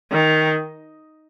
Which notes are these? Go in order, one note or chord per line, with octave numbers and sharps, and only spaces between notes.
D#3